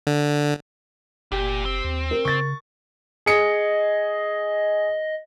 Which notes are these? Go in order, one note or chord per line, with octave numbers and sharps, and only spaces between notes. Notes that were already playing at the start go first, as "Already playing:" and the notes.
D3
F#1 A#2 G4
C4
D#2
A#4
C#3 C#6 A6
G#4 D#5 C#7